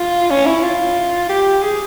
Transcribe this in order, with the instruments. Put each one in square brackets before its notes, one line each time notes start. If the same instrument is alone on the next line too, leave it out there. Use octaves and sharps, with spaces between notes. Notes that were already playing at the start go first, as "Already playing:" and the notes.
Already playing: [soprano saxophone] F4
C#4
E4
F4
G4
G#4